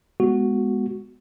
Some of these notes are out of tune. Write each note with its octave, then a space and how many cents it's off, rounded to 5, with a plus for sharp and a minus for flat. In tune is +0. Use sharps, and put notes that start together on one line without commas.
G#3 +0 B3 +0 F#4 +0